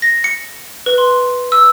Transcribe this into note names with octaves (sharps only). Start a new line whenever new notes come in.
A#6
C#7
B4
C6
E6